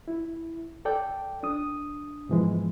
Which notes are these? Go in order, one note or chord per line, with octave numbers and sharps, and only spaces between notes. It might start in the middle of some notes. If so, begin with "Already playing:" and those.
E4
A4 D5 G5
D4 D#6
G#2 B2 E3 F3 G#3